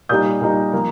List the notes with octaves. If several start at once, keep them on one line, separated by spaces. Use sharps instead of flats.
A#2 G3 D#4 D#6 G6
A#2 G3 D#4
F3 A#3